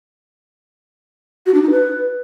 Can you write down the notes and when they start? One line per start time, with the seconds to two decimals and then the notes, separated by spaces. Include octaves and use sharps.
1.46 F#4
1.54 D4
1.62 D#4
1.71 B4